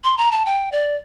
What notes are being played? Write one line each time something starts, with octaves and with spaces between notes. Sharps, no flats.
C6
A#5
A5
G5
D5